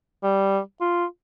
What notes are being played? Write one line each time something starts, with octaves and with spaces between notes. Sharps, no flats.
G3
F4